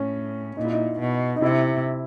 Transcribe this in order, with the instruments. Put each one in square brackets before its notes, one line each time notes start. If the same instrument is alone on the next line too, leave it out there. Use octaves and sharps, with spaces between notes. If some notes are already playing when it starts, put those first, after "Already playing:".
Already playing: [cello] A2 [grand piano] C#4
[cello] A#2 [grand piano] D#4
[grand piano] E4
D#4
[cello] B2
[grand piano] D#4
[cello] C3 [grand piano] E4